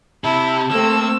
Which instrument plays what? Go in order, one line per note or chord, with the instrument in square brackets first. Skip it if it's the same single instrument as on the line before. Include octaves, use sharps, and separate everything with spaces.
[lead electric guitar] C3 [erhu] E4 [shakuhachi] A5
[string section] A3 C4 [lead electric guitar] A#3 [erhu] E6